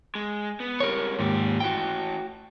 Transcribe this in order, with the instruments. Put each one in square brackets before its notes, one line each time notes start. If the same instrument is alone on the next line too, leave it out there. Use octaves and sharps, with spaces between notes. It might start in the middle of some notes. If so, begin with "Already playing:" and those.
[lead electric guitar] G#3
B3
[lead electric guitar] C#2 G3 [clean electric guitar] A#4 C#5
[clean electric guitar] D#2 G#2 [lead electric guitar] F3 G4
[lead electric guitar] A2 E3 [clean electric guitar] F#4 G5